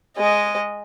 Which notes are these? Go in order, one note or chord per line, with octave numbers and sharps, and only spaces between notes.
G#3 D#5